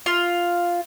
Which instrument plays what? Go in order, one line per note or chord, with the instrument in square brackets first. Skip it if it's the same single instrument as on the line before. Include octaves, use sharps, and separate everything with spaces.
[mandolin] F4